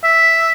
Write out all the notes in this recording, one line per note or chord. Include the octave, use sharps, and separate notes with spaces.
E5